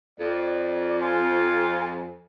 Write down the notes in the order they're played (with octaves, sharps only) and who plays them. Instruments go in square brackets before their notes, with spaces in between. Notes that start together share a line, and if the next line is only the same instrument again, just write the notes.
[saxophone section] F2 [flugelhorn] D5
[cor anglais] F4 [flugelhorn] G#5